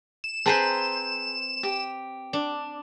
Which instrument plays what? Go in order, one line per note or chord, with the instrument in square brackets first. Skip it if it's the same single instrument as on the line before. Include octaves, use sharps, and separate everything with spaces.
[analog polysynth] E7
[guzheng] C4 B4 C5 [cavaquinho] G#4 A5 A#5
[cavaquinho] G4
[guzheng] D4